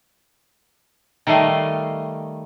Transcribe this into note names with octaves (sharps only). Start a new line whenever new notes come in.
D#3 G3 A3 D#5 F5